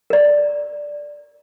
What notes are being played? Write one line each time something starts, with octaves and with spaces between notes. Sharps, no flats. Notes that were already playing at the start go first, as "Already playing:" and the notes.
A#4 D5